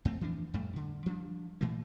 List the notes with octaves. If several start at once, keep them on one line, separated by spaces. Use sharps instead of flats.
F2 A3 C4
E3 F3 D4
F2 A2 G3 A3
D3
F3 G3 C#4 D4
A#2 E3 A3 A#3